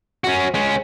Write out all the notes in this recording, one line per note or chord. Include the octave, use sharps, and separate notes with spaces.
C#4 F#4
G#3 C#4